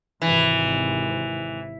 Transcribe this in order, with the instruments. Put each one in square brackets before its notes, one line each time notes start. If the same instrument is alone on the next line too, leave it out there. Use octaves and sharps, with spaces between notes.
[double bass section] G#1 C3 [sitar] E3